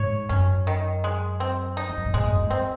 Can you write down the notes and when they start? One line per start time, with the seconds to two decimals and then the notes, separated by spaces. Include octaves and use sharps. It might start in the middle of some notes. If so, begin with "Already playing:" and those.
Already playing: G#2 C#5
0.29 F#2 C#4
0.67 D#3
1.04 G#3
1.40 C4
1.77 D#4
1.89 F2
1.97 F#2
2.06 G#2
2.14 A#2 G#3
2.26 F#2
2.33 G#2
2.44 F#2
2.50 C4